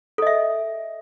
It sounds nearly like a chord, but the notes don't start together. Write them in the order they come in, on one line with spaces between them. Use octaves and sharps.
A4 D#5 E5